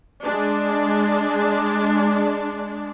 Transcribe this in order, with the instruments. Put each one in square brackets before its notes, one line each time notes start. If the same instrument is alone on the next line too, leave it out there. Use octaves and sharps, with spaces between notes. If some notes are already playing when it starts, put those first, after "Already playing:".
[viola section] G#3 D4